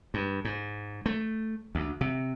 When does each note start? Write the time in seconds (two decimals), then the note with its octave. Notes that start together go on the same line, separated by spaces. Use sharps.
0.14 G2
0.45 G#2
1.06 A3
1.75 D2
2.01 C3